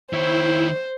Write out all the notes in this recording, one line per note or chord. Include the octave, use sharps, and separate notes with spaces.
D#3 E4 C5 C#5